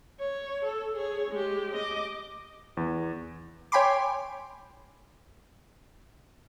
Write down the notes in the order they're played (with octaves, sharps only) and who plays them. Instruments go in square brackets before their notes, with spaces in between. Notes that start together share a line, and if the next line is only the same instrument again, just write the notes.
[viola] C#5
A4
G#4 C#5
G#3 G4
D#5 D6
[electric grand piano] E2
[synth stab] C#5 G5 G#5 B5 C6 D6